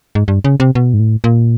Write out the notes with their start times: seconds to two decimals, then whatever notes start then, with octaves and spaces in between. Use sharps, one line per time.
0.15 G#2
0.28 G2
0.44 C#3
0.60 C3
0.75 B2
0.94 G#2
1.00 A2
1.24 A#2